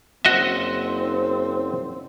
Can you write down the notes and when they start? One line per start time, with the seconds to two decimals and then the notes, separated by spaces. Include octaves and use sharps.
0.25 F#1 C4 F#4 D#5 E5